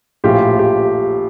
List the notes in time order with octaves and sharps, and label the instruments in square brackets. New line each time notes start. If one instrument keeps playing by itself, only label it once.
[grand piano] A#1 A2 F3 F4 G4
G4